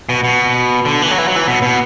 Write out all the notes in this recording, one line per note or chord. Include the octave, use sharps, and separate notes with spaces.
B2
B2
D3
E3
F#3
E3
F#3
E3
B2
B2